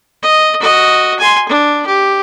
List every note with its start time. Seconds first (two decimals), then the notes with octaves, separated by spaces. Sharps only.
0.23 D#5
0.60 F#4 D#5
1.19 G#5 C6
1.48 D4
1.86 G4